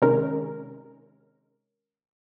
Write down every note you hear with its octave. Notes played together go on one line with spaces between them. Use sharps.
C3 D#3 G#3 C#4 A#4